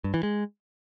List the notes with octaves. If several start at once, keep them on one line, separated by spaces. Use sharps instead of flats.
G2
E3
G#3